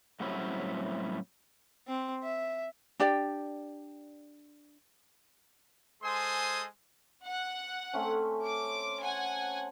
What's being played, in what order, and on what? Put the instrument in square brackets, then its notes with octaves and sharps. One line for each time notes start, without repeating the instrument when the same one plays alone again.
[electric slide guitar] A2 F#3 G3 C4 C#4 E4
[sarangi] C4
E5
[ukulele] D4 G4 D5 G5
[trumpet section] G#3 A4 C5 G#5 C6 D#6
[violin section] F#5
[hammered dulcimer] A3 C4 C#4
[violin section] D6
F#5 G#5